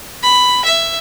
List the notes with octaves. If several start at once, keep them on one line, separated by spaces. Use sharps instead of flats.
B5
E5